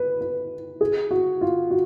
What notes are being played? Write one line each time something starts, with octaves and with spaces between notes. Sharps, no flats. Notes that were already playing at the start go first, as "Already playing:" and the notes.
Already playing: B4
B4
G#4
F#4
F4
F#4